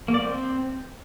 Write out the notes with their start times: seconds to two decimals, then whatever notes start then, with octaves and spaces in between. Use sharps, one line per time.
0.08 A#3
0.14 D5
0.20 C4